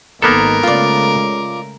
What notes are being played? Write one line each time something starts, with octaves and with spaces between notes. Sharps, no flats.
G#1 D#3 A#3 B3 A4 A#4
C#3 G#3 A3 F4 D5